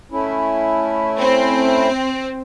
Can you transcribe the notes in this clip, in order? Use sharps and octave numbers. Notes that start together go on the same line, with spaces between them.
A3 C#4 E4
C4